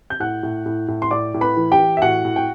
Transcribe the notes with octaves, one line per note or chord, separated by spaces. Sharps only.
G6
A2 F#5 F#6
A2
A2
A2
C6
A2 D5 D6
A2
B4 B5
E3
G4 G5
E3
E5
A2 F#4 F#5
A2
G5